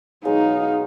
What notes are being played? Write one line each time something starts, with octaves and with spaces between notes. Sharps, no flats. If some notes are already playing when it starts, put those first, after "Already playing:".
B2 F#3 G#3 D#4 G#4 F5